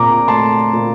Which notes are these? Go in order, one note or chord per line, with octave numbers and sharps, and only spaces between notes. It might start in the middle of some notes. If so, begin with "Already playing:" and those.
Already playing: A#2 C4 A#5 D6
A3 A5 C6
A#2